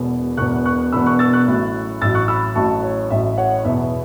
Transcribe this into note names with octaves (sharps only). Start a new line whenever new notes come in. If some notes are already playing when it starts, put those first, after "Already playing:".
Already playing: E1 E2 B2 B3
E1 E2 B2 B3 C#6 F#6
C#6 F#6
E1 E2 B2 B3 B5 E6
C#6 F#6
E6 A6
C#6 F#6
A1 A2 F#3
A1 A2 F#3 E6 A6
C#6 F#6
B5 E6
A1 A2 F#3 A5 C#6
C#5
A1 A2 F#3 E5
C#5 F#5
E2 B2 B3 E4 E5